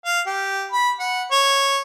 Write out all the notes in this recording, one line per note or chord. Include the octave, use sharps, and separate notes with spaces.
F5
G4
B5
F#5
C#5